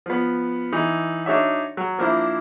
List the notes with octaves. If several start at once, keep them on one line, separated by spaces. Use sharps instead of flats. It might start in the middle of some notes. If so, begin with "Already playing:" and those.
F3 B3
E3 D#4
D4 D#4 F#4 C#5 E5
F#3
F3 A#3 D4 E4 C5